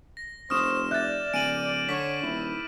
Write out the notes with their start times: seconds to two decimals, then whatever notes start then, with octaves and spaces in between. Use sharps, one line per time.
0.17 A#6
0.50 F1 C5 C#6 D#6 F6 E7
0.91 D5 E5 F#6 G6 A6
1.34 D1 G#5 D7 D#7 F#7
1.89 D3 C#5 D6 B6
2.22 D#1 E4